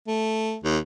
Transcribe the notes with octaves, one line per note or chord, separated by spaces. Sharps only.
A3
D#2